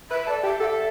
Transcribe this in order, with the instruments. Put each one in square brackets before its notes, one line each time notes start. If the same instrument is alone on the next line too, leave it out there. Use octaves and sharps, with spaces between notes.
[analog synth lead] B4 [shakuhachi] E5
[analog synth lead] A4 [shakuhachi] D5
[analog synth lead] G4 [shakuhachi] E5
[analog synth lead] A4 [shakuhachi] F#5
[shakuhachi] E5